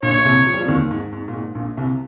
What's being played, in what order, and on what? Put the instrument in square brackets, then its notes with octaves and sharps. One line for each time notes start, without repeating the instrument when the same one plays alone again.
[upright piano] A#1 A#2 [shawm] C#5
[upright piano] A#2
C2 C3
F3
G3
F2 F3
D#2 D#3
G#2
G#2
A#2
G#2
A#1 A#2
C2 C3